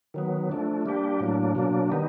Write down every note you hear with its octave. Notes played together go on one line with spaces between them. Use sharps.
D#3 F#3 B3
F3 A3 D4
G3 A#3 D4 G4
A2 F#3 A#3 D4
B2 F#3 A#3 D4
D#3 G3 B3 D#4